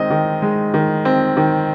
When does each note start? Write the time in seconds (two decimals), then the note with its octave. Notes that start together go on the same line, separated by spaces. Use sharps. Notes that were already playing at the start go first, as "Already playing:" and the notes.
Already playing: D#3 G#3 C4 D#5
0.10 D#3
0.42 G#3
0.74 D#3
1.05 C4
1.37 D#3